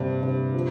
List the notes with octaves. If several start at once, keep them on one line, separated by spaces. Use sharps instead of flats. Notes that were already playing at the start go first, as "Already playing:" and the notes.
Already playing: G2 C3 G3 A#3
C3
F3